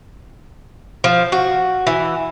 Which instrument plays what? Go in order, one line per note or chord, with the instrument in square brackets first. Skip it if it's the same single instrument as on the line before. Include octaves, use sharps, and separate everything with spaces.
[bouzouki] F3
F#4
E3